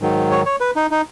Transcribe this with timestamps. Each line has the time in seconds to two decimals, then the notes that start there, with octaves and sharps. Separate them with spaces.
0.01 G#2 D#3 F#3
0.31 C#5
0.46 C#5
0.60 B4
0.76 D#4
0.91 D#4